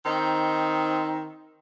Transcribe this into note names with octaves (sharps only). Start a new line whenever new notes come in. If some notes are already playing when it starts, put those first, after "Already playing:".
D#3 C4 D#4